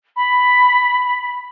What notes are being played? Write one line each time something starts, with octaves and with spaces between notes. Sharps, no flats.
B5